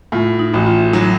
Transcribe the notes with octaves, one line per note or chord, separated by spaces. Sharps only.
A2 F4
D#4
A1 F#4
F4
F#3 D#4